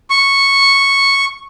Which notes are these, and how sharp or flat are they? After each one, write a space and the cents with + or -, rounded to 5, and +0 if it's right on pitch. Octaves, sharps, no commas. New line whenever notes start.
C#6 -5